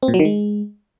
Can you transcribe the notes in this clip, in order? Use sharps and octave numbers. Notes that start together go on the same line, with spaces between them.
C4
A#2
F#3
D#3
G#3